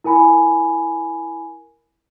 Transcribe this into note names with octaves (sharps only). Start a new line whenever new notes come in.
E4 A#4 G#5 B5